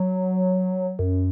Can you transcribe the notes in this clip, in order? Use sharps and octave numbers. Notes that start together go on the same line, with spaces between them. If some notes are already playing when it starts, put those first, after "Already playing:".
Already playing: F#3
F#2